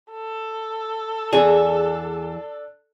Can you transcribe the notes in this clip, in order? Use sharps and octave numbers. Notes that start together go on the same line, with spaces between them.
A4
E2 D4 G#4